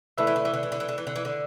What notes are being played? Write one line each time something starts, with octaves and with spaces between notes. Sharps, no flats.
D3 A3 E4 B4 E5
E3
D3
E3
D3
E3
D3
E3
D3
E3
D3
E3
D3